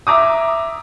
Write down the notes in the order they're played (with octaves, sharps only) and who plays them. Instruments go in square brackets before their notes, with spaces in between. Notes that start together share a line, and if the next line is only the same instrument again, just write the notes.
[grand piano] E5 A#5 D6 D#6